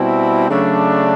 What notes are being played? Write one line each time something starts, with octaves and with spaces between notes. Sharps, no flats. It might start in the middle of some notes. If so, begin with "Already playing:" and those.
Already playing: B2 G3 C4 E4
C#3 F#3 A3 D4